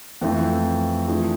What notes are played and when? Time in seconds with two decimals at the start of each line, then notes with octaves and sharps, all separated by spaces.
0.21 F2 E3 A3 C4
1.08 E3 A3 D4 F4 G#4